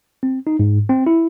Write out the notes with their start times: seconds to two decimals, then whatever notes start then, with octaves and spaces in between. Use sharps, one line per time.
0.23 C4
0.47 D#4
0.59 G#2
0.89 C4
1.07 E4